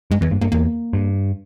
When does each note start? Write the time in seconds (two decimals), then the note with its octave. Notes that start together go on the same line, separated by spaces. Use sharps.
0.11 G2 G#3
0.21 E2 E3
0.31 G2 A#3
0.41 G2 A#3
0.52 E2 A#3
0.93 G2